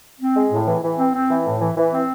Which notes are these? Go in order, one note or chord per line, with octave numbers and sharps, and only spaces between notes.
C4
G#3
A2
E3
E3
C4
C4
E3
A2
E3
E3
C4